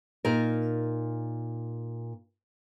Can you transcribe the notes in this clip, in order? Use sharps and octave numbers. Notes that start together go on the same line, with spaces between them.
A#2 D#4 A#4